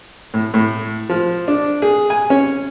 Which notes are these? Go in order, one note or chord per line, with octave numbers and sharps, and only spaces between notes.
A2
A2
F3
D4
G#4
G#5
C#4